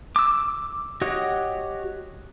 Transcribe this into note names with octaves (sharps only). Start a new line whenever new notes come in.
D6 E6
F#4 G4 C#5 D#5 F#5